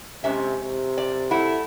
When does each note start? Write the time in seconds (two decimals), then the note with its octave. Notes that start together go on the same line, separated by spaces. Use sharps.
0.24 C3 G#3 C#4 E5
0.63 C3
0.98 D5
1.31 A3 E4 F#5